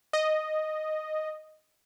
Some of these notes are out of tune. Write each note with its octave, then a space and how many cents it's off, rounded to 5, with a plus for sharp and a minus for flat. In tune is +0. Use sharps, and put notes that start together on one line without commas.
D#5 -5